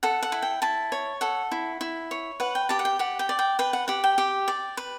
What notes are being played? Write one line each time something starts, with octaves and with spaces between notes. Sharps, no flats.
A4 F#5
F#5
E4
G5
E4 A5
C#5
A4 F#5
E4
E4
C#5
B4 F#5
G5
G4 A5
F#5
G5
G4 F#5
G5
D5
G5
B4 G5
F#5
G4 F#5
G5
G4
D5
B4